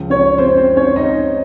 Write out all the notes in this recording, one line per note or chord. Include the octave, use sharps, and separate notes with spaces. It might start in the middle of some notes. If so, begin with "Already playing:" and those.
Already playing: C#2 C#3 F3
C#4 C#5
C4 C5
C4 C5
C#4 C#5
D#4 D#5